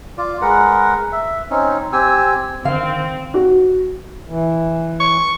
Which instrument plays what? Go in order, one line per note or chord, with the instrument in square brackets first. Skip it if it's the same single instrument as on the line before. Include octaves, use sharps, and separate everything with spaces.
[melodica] F4 D5
G#3 A#4 B4 F#5
E5
C4 C#4 D#4
C4 G4 G#5 E6
[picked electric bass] D3 D#3 [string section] C4 [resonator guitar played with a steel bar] F5
[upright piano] F#4
[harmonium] E3
[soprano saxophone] C#6